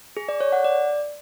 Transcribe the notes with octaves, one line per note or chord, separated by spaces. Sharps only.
G#4
D5
C#5
F#5
D5